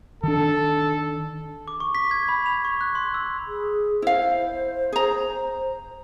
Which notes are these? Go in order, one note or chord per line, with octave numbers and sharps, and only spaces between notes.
D#3 D4 A4
D6
C#6
B6
G#6
B5
F7
C#6
F#6
C6
E6
G#4
E4 C5 F5
G#4 A#5